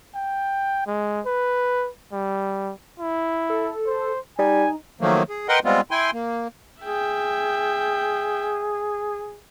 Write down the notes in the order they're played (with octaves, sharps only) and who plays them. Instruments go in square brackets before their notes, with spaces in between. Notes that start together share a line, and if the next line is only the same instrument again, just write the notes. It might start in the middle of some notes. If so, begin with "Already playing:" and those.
[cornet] G5
G#3
B4
G3
E4
[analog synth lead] A4
[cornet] C5
[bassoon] G3 [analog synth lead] D#4 [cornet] G#5
[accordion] D#3 F3 F#3 A3 A#3
G#4
A#4 B4 D#5 F#5 G5 C6
G3 G#3 B3 C4 F4
E4 G5 G#5 C6
A#3
[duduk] G#4 [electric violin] E5 G5